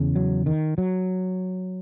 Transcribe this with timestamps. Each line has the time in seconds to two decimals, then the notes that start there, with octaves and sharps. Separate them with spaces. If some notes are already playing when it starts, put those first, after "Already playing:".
Already playing: E2 C#3
0.16 F#3
0.46 D#3
0.78 F#3